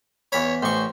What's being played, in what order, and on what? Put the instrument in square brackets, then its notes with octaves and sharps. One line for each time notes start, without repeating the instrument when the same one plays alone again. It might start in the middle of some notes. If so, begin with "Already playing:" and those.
[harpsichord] E2 B5 [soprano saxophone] C#5
[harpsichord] A1 C#6 [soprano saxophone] C5